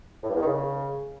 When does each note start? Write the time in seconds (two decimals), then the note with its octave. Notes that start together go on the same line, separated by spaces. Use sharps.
0.23 A2
0.29 G2
0.35 E2
0.41 D#3
0.46 C#3